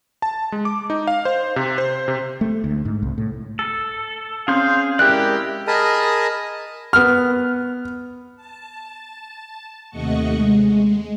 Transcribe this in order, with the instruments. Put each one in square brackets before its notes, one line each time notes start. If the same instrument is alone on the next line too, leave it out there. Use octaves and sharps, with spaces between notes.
[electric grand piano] A5
G#3
D6
D#4
F5
C5
C3
C5
C3
[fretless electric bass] A3
D2
G#2
C2
A2
[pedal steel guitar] A4
[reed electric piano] C4 C#4 [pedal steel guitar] G#4 C6 G6 [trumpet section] F5
[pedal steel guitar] G#3 A#4 D5 [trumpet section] E4 G4 [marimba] F#6
[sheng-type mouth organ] G#4 A#4 D#5 A5 B5 D#6
[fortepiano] B3 F6
[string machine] A5
D#2 C3 A3 D#5 F#5 C#6
G#3